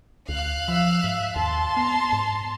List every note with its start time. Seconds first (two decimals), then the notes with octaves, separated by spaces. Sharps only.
0.29 D2 F5 F#6
0.68 F3 E5
1.04 G#2
1.36 D#2 A5 C6
1.77 B3 A#5
2.13 G#2